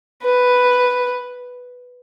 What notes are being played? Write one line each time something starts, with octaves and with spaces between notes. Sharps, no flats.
B4